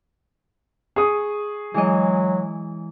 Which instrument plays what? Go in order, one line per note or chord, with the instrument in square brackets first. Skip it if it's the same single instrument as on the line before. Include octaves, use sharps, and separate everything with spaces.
[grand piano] G#4 D#6 [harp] C#6
[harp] E3 G#3 D#5 [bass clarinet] F#3